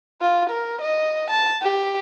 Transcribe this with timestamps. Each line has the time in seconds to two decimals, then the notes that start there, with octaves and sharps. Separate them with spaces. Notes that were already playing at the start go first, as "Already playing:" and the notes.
0.21 F4
0.50 A#4
0.81 D#5
1.31 A5
1.62 G4